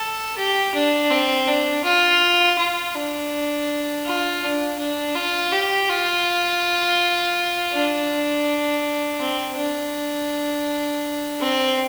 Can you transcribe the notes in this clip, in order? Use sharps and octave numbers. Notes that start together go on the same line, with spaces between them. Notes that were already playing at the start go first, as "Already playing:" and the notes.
Already playing: A4
G4
D4
C4
D4
F4
F4
D4
F4
D4
D4
F4
G4
F4
D4
C4
D4
C4